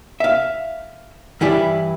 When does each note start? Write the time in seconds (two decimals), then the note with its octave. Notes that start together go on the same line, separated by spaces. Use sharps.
0.20 E5 F5
1.41 G2 E3 E4 D5